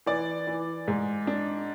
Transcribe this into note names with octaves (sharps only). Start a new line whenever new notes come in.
E3 D5
E3
G#2
D4